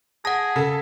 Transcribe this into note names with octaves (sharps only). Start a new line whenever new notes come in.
G#4 F#5 A5 A#6
C#3 A4 B6